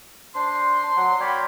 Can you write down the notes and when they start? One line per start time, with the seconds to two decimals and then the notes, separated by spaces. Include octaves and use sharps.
0.35 D4 C5 C6
0.97 F#3 F#5
1.20 A#3 C#5 D5 G5 B5